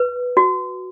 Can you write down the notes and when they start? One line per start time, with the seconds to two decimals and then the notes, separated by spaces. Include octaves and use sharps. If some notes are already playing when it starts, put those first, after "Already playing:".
Already playing: B4
0.37 F#4